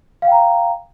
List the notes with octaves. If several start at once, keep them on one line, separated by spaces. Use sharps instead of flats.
F5 G5 A#5